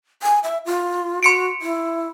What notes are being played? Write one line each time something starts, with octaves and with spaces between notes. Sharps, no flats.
G#5
E5
F4
F#4 C6 C#7 D7
E4